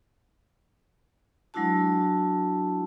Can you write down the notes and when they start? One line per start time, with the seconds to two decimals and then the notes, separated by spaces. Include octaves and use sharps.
1.54 F#3 G#3 D4 E4 F#4 A5